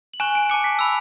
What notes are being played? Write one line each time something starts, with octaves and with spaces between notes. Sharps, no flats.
F#7
G#5 C#6 F#6 E7
D7
A5 D6 F#6 C#7
B6
B5 E6